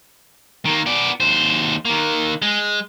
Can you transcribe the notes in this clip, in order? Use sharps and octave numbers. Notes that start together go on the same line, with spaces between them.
D#3 A#3
B3 D5
D#2 C5
D#3 A#3
G#3